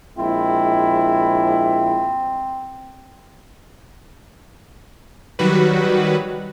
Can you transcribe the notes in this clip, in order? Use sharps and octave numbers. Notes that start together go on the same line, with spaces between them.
A#1 G#3 C4 E4
D#3 F#3 G3 F#4 B4